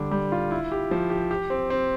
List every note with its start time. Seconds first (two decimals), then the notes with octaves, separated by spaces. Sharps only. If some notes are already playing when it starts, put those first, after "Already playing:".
Already playing: D3 G3 D4
0.11 G3
0.32 F4
0.51 E4
0.72 G4
0.91 F3
1.10 G4
1.31 G4
1.50 C4
1.70 C4